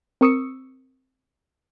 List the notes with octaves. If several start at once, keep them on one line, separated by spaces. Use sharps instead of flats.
C4 A#4 C#6 D#6 E6 C#7